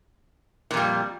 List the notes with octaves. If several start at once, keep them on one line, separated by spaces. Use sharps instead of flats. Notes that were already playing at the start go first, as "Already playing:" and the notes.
F2 A#2 G3